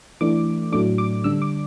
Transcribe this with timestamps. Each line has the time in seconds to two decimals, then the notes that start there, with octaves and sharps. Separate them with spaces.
0.21 E3 A3 D4 D6
0.72 A2 F#3 A3 D4 D6
0.98 D6
1.24 D3 G3 D4 E6
1.42 D6